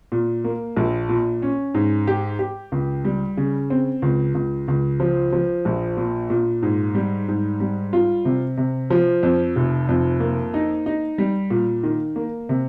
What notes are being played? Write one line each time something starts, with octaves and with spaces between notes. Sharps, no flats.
A#2
A#3
A#1
A#2
C#4
G#2
G4
G4
C#2
G3
C#3
C4
C#2
C#2
C#2
F3
F3
A#1
A#2
A#2
G#2
G3
G#2
G3
F4
C3
C3
F3
F2
F1
F2
A#3
D#4
D#4
G3
A#2
D#3
A#3
C3